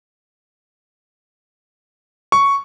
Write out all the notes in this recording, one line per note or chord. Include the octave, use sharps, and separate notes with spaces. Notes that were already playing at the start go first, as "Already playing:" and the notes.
C#6